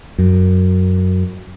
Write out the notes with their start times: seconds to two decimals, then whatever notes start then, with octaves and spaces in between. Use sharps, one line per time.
0.18 F#2